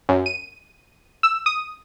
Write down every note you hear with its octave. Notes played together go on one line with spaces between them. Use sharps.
F#2
D#7
E6
D#6